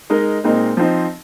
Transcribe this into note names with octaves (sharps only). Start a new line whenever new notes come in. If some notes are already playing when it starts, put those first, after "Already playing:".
G#3 D#4 A#4
A#2 G#3 C4 D#4 A#4
F3 C4 D#4